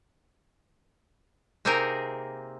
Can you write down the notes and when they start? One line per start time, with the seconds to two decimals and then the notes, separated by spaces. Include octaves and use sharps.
1.65 C3 A#3 C4 D#4 G#4 A#4